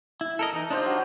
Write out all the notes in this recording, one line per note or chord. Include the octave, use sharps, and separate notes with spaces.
E4
A4 A#4 D#5
E3 D#4
D4 D#4 F4 G4 C5 D#5
F#3